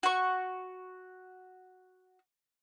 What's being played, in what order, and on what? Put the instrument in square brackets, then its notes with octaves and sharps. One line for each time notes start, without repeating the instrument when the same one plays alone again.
[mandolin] F#4 C#6